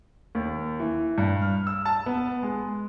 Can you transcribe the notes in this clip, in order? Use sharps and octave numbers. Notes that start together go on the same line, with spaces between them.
D#2
E3
G2
F6
E6
A5
B3
G#3